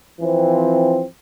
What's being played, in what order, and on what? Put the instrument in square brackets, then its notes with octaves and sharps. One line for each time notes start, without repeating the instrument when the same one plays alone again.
[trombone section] E3 F3 C4